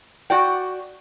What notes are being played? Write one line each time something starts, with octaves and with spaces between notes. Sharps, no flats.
F#4 D5 G5